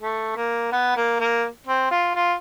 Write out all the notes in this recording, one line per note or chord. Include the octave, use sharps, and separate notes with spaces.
A3
A#3
B3
A#3
A#3
C4
F4
F4